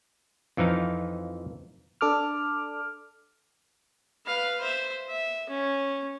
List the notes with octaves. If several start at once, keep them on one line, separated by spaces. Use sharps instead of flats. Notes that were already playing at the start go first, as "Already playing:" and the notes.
F2 E3 F3 D#4 F5
D4 A4 D6 F6
B4 F5
C5 E5
E5
C#4